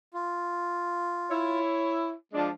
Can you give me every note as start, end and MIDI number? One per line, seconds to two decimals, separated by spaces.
0.14 1.60 65
1.30 2.12 64
1.30 2.12 73
2.33 2.50 53
2.33 2.50 56
2.33 2.50 62